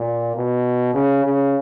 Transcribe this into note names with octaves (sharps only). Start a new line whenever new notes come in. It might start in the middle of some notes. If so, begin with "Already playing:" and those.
Already playing: A#2
B2
C#3
C#3